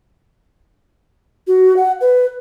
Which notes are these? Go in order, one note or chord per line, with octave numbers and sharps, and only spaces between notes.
F#4
F#5
B4